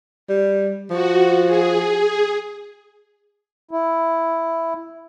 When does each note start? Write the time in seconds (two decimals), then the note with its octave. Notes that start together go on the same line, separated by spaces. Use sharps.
0.29 G3
0.90 F3 F#4
1.47 G#4
3.71 E4